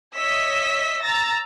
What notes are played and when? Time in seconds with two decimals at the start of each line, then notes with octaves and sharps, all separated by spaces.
0.16 C#5 D#5 E5 E6 B6
1.04 A#5 E6 A6 A#6